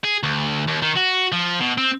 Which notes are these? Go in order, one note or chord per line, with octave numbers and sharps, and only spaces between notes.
G#4
D2
D#2
D#3
F#4
F3
B2
C4